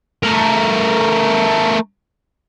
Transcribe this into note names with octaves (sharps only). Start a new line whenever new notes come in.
A3 A#4